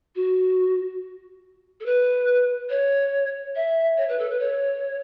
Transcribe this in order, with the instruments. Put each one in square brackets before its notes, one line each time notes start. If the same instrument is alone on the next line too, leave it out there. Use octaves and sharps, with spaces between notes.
[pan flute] F#4
A4
B4
C#5
E5
C#5
B4
A4
B4
C#5